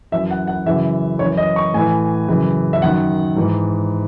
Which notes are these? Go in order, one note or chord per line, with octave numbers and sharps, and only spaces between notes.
F#2 E3 E5
F#5
F#5
F#2 C#3 E3 E5
F#2 E3 C#5
D#5
C#6
A2 E3 G#5
F#2 C#3 E3
E5
F#2 D#3 F#5
G#2 E3